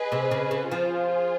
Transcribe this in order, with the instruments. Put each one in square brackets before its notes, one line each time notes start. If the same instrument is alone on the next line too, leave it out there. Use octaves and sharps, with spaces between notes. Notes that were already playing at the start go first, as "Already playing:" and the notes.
Already playing: [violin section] G#4 B4 D#5
[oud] C3
C#3
C#3
[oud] F3 [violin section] F4 G#4 C5